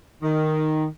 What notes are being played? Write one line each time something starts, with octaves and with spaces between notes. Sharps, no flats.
D#3